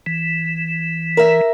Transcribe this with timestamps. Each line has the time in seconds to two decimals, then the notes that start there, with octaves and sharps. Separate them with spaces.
0.06 E3
1.17 A#4 E5